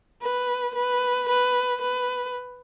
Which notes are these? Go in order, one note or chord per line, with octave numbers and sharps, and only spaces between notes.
B4
B4
B4
B4